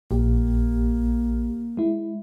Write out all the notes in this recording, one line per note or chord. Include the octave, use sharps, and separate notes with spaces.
A#1 A#3 G4
G#3 E4